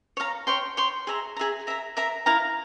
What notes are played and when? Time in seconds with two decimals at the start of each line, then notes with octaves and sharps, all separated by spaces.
0.17 C#5 F5 A#5
0.47 C#5 G5 C6
0.77 C#5 G5 C6
1.07 G#4 E5 A#5
1.37 G#4 E5 A#5
1.67 A#4 E5 A#5
1.97 A#4 E5 A#5
2.26 E4 A#4 F5 A#5